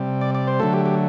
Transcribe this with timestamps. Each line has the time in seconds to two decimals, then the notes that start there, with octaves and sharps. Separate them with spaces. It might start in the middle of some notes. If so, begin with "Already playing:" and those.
Already playing: C3 G3
0.21 D5
0.35 D5
0.47 C5
0.60 D3 F#3 A3 A4
0.73 G4
0.86 G4